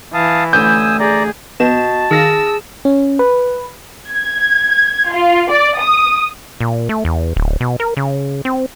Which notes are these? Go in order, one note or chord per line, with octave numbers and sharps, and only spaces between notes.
E3 F5 A5 D#6
A1 D3 G#5 D#6 E6 G6
G#4 D5 A#5
A#1 B3 F#4 D#5 A5 E7
D#3 G#4 F5 E6 A#6
C#4
B4
G#6
F4
D5
D#6
A#2
A3
E2
D1
B2
A#4
C#3
C4